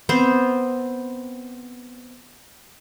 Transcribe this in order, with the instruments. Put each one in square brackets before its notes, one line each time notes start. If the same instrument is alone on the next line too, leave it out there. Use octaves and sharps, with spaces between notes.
[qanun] B3 C4 C5